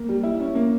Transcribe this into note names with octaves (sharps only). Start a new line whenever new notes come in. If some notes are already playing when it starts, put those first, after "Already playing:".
Already playing: A#3
G3
E4
C#4
A#3